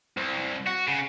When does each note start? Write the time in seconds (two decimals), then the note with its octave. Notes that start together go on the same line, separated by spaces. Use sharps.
0.17 C2
0.67 F#4
0.88 C#3